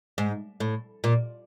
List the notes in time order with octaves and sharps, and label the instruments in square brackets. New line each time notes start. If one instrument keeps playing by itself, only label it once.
[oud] G#2
A2
A#2